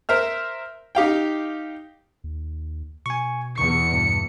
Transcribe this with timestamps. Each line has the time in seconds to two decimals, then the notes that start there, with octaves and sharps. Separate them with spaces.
0.09 A#4 C5 E5 F6
0.95 D#4 G4 F5 G5
2.24 D#2
3.06 B2 G#5 C#6
3.58 E2 C#6 C#7
3.92 G2 B2